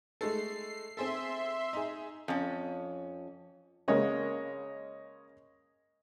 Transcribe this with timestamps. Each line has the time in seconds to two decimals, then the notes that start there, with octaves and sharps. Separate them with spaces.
0.21 G#3 A3 A4 C7
0.97 C4 G#4 A4 E5 C6
1.73 D#4 G#4
2.28 F2 C#4
3.88 C#3 G#3 A#3 C#5 D#5